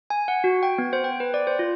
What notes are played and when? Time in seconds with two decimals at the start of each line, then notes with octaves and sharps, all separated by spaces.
0.10 G#5
0.28 F#5
0.44 F#4
0.63 G5
0.78 B3
0.93 C5
1.04 G5
1.20 B4
1.34 D5
1.47 C5
1.59 F4